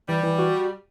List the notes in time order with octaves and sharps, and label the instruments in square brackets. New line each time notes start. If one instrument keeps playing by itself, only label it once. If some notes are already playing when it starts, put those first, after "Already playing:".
[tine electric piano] E3 [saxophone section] G3
[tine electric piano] E3
F#4